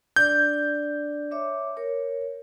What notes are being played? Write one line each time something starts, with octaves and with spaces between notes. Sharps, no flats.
D4 D5 G6
C#5 E5 D6
A#4 C#5